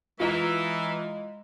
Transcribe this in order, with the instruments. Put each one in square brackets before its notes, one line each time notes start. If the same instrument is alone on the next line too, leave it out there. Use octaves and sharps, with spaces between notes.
[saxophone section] E3 [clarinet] G#3 [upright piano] F4 D#5 A#5